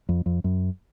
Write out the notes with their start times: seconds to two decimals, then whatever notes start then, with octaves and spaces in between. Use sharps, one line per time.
0.09 F2
0.26 F2
0.44 F#2